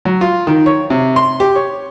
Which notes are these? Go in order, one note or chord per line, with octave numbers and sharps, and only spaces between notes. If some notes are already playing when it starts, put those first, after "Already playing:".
F#3
F4
D#3
C#5
C3
C6
G4
C#5